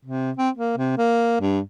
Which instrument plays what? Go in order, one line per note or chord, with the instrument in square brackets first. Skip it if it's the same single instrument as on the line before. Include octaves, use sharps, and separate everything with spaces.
[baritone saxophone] C3
C4
A#3
C3
A#3
G2